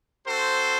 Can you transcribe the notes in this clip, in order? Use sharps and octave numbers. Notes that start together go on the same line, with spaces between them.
C4 F#4 A4 C5